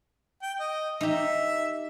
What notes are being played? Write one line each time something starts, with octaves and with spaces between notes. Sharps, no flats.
G5
D#5
D#4 G4 E5